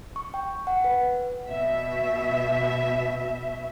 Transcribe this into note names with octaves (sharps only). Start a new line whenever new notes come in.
C#6
G5
F#5
B4
B2 E5